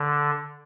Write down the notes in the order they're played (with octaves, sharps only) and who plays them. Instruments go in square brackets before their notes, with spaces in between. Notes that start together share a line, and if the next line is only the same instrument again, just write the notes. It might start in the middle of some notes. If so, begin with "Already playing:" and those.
Already playing: [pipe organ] D3